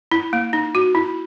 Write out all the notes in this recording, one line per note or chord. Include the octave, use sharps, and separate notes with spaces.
E4
A#3
D#4
F#4
E4